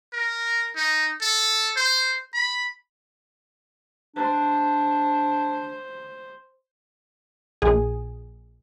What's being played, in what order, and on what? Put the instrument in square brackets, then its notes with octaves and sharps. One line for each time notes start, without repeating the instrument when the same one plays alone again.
[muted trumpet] A#4
D#4
A4
C5
B5
[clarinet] D4 [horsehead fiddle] C5
[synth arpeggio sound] A#1 G#4